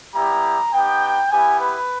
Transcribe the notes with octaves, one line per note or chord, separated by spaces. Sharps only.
G3 B3 E4 G4 A#5
B3 D#4 G4 G5
B3 E4 G4 G#5
B4